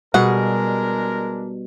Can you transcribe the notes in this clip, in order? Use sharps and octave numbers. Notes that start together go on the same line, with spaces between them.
B2 G3 G#3 D4 G#4 A#4 F#5